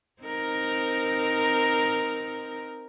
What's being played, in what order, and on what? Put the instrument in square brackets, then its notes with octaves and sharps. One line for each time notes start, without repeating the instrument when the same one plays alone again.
[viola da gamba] C4 D#4 A#4